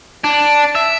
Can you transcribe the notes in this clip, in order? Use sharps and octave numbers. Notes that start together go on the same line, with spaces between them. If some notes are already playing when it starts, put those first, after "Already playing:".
D4
E5